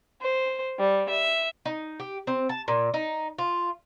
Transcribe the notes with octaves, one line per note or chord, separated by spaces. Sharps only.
C5
G3
E5
D#4
G4
C4
A5
A#2
D#4
F4